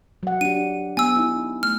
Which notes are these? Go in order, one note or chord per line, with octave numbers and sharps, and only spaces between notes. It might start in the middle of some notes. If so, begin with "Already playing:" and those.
F#3 F#5
D4 G4 D#7
B3 G#5 E6
B3 D#4 E4
A3 F6